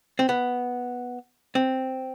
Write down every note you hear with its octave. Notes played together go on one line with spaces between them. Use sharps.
C4
B3
C4